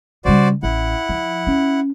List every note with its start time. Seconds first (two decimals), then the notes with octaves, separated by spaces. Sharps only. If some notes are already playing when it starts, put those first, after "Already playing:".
0.25 C#3 G3 F#4 C5 D5
0.63 A1 E4 F#5
1.09 F3
1.47 C#4